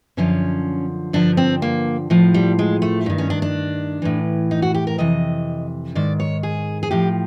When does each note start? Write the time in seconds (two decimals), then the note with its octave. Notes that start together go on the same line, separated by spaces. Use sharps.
0.17 F#2 D3 F3 C#4
1.13 G2 D3 F3 D4
1.37 C4
1.62 A#3
2.10 A2 F3
2.34 G3
2.59 G#3
2.82 A3
3.06 G2 D#3
3.18 C#4
3.30 D4
3.42 D4
4.02 A2 E3
4.51 D#4
4.62 F#4
4.75 G4
4.87 A#4
4.98 F2 C3 E3 D#5
5.95 G#2 D#3 D5
6.20 C#5
6.43 G#4
6.83 G#4
6.91 A2 F3 G4